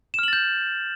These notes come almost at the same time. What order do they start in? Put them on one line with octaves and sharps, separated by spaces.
E7 F6 F#7 A6 G6